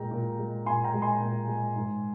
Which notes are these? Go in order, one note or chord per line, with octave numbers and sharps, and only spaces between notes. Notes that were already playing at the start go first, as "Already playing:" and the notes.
Already playing: A#2 G#3 G5 A#5
A#2
G#3
A#2 G#5 C6
G5 A#5
G#3
G#5 C6
A#2
G#3
G#2